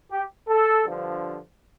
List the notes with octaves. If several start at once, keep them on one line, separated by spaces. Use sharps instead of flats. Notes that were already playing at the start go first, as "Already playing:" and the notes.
G4
A4
G2 D3 F3